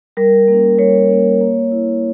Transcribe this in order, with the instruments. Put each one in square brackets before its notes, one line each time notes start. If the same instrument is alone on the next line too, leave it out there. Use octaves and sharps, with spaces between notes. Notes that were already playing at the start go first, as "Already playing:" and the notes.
[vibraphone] G3 A#4
A#3 C#4
G3 C#5
A#3 C#4
A#3
E4